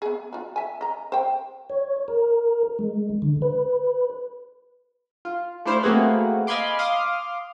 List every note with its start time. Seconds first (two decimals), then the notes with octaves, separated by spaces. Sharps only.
0.02 B3 G#4
0.33 F4 F#4
0.56 E5 G#5
0.81 D#5 A#5
1.12 C5 G5
1.70 C#5
2.08 A#4
2.79 G#3
3.22 D3
3.42 B4
5.25 F4
5.65 A3 D4 E4 C5 F5
5.83 A3 A#3 C4 F#4 G#4 B4
6.47 D#5 F5 G#5 B5 C6 D6
6.79 F5 C6 D6 D#6 F6